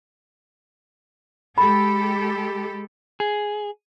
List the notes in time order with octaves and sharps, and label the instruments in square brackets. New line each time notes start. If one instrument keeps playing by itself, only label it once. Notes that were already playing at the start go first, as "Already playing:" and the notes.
[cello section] G#3 G4 A4 [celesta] B5
[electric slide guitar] G#4